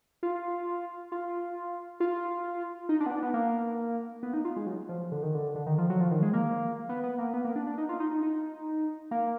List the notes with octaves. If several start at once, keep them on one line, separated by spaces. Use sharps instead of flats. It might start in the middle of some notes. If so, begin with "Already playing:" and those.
F4
F4
F4
D#4
D4
B3
D4
B3
A#3
B3
D#4
F4
G#3
F#3
F3
D3
D#3
D3
D3
D#3
F3
F#3
F3
D#3
G#3
A#3
B3
B3
A#3
B3
A#3
D4
D4
D#4
F4
D#4
D#4
D#4
A#3